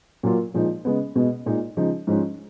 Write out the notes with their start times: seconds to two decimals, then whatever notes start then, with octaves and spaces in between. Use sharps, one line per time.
0.23 A#2 F#3 A#3 F4
0.54 A#2 F3 G#3 D#4
0.85 C#3 G#3 B3
1.15 B2 G#3 B3
1.46 A#2 G#3 D#4
1.77 C#3 F3 G#3 D#4
2.07 G#2 F3 G#3 C#4